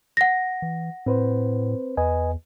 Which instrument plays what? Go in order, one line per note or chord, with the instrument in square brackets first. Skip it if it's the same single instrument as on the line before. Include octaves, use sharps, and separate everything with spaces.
[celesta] F#5 A#6
[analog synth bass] E3
[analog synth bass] A2 [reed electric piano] C4 B4 C5
[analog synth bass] E2 [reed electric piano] B4 D#5 G#5